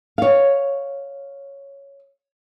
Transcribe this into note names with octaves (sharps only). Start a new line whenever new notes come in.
C#5 F5